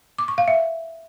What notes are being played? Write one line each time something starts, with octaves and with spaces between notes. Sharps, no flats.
D6
C#6
F5
E5